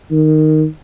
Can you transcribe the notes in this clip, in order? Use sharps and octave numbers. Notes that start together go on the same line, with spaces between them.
D#3